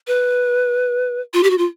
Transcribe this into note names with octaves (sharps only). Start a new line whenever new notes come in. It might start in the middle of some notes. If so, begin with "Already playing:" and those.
B4
F4
G4
F#4
F4